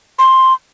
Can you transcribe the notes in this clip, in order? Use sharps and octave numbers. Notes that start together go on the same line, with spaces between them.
C6